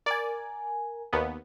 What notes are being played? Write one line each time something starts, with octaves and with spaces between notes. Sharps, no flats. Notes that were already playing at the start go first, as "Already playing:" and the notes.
A#4 D5 G#5
D#2 B3